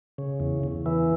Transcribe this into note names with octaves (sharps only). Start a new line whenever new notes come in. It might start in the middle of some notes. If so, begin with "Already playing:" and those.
C#3
E2
E2
E3